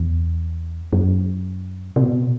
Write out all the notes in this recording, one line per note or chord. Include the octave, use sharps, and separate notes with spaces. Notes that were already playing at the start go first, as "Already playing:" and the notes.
Already playing: E2
F#2
C3
B2